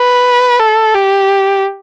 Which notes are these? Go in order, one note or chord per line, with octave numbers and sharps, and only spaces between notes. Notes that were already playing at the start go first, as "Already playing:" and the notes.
Already playing: B4
A4
G4